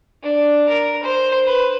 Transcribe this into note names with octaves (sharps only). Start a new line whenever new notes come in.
D4
A#4
C5
B4